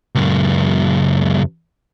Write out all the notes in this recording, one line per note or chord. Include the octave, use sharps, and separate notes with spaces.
C#2 F#2